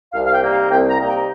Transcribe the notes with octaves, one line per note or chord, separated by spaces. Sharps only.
C2 F5
F5
G5
C3 G3 A#3 D#4
F5
C2 G5
A#5
C3 G3 A#3 D#4
G5